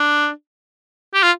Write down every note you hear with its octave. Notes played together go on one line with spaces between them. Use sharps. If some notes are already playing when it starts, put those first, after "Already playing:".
Already playing: D4
G4
F4